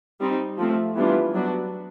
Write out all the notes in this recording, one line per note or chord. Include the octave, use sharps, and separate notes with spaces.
G3 C4 D#4
F3 A3 C4
E3 G3 B3 D4 F4
F#3 B3 D4 F#4